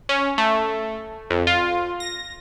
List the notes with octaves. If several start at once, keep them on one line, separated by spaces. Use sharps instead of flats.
C#4
A3
F2
F4
A#6